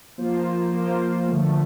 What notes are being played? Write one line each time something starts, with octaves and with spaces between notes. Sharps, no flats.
F3 A#3 F4 C5
F3 A#3 F4 C5
D3 F3 A3